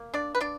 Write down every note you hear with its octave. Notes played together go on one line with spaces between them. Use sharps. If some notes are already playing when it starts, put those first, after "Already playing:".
Already playing: A#3
D4 D5
B4
D4 D5